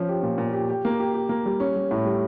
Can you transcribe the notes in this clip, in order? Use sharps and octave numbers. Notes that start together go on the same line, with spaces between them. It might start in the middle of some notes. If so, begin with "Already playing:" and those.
Already playing: F3 C#4
G4
A#2
A#2
G4
G4
A#3
G4
G4
A#3
G3
C#4
G3
A2
G3